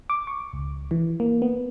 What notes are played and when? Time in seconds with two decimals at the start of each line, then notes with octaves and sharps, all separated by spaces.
0.10 D6
0.27 C#6
0.53 C#2
0.91 E3
1.20 A#3
1.42 B3